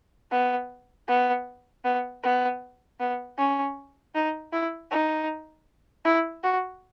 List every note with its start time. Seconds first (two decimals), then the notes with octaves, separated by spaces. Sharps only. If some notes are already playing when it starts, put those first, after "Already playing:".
0.31 B3
1.08 B3
1.84 B3
2.23 B3
3.00 B3
3.38 C#4
4.15 D#4
4.52 E4
4.91 D#4
6.05 E4
6.43 F#4